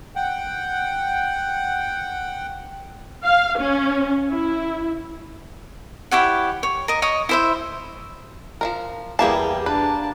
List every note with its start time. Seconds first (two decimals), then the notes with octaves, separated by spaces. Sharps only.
0.16 F#5 G5
3.24 F5
3.59 C#4
4.30 E4
6.11 E4 G4 C#5 F#5
6.63 C#5
6.88 A#4 D#5
7.02 C#5 D#5 D#6
7.29 E4 C5 E5
8.61 F3 G#3 A#4
9.19 E2 G3 A#3 E4 G4 G#4 F5 A5
9.66 D4 B4 A5